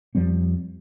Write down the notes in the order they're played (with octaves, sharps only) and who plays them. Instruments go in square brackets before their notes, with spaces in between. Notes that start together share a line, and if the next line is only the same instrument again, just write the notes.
[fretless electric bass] F2 F3 G3 C4